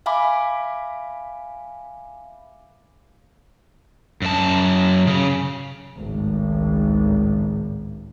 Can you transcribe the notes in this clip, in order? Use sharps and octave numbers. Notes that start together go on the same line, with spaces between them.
E5 F5 G#5 B5 D6
F#2 A5
C#3
G#1 C#2 A2